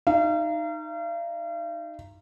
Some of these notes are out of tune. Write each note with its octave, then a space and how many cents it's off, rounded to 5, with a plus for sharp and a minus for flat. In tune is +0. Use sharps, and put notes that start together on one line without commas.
D#4 -10 F5 -40